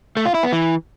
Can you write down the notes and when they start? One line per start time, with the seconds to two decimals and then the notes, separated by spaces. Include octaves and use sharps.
0.17 A3
0.26 F4
0.34 E4
0.43 B3
0.52 E3